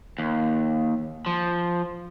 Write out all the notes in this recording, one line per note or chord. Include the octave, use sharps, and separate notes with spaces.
D#2
F3